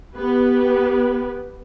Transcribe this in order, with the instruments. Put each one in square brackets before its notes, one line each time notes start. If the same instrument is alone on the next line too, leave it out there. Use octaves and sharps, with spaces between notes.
[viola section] B3 G4 B4